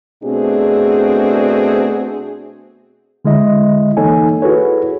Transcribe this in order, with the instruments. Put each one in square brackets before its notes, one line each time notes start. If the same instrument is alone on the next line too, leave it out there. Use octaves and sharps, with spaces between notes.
[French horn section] B2 A3 C4 D4 F#4 G#4
[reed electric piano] D3 G#3 E4 D#5 E5
E3 A#3 D#4 A4 C#5 G#5
E4 F#4 G#4 A4 B4 C#5